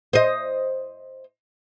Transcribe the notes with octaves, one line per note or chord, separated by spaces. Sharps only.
C5 D#5